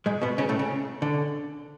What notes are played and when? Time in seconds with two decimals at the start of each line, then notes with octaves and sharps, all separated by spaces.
0.06 G#2 G#3
0.22 B2 B3
0.38 C#3 C#4
0.49 A2 A3
0.59 C#3
1.02 D3